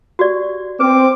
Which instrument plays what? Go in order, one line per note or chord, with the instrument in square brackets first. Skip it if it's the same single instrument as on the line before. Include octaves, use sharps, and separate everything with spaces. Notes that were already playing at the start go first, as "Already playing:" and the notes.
[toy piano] F#4 G4 D5
[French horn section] C4 [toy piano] B4 [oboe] D6